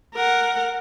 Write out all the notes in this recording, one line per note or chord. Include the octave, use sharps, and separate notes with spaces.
A#4 F#5